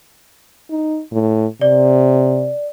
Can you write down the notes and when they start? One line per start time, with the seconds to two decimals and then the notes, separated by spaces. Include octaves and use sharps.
0.70 D#4
1.12 A2
1.61 C3 D5